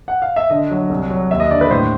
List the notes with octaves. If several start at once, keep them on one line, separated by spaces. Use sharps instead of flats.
F#5
F5
E5
D3 D#5
F#3
C2
F#3
D#2 E5
D#5
D3 D5
B4
A2 C5